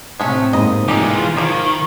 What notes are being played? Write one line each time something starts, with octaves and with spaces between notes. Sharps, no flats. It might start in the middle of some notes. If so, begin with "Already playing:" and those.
A2 C3 G#3 A3 C#4
G#2 A#3 D#5 B5
E3 G#3 D#4 F4 G4
D#3 F3 E4 D6